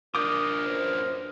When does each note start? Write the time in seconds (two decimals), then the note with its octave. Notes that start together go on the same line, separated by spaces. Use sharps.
0.15 D4 F4 A#4 D6 D#6 G6
0.66 F#2 B4 C5